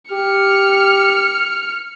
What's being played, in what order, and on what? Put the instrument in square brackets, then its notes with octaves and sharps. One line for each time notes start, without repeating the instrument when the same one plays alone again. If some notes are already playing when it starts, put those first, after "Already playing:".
[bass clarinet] G4 [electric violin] F6 C#7